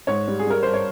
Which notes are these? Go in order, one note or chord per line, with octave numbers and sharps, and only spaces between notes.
G#2 C#5
G3
G#4
G3 A#4
G2 C5
C#5